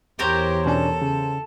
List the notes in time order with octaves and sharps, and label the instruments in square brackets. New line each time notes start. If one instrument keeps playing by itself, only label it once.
[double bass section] E2 [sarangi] G4 [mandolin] A#4 C5 C#5
[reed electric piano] B2 C#4 D4 [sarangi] A4
[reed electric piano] C#3